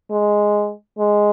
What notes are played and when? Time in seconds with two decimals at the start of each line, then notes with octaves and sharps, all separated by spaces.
0.11 G#3
0.99 G#3